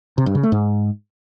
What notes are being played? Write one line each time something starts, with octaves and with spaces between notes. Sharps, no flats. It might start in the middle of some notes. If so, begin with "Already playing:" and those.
C3
G2
C#3
A3
G#2